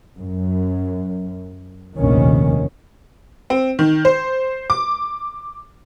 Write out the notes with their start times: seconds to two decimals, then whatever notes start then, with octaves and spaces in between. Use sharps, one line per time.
0.18 F#2
1.98 F1 A#1 D#2 D#3 C#4
3.50 C4
3.79 D#3
4.05 C5
4.70 D6